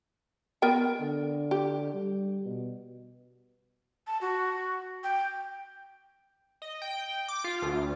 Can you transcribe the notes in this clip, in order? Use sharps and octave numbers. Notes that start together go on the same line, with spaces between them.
B3 A#4 G5
D3
G4
G3
B2
A5
F#4
G5
D#5
G5
D6
F4
D2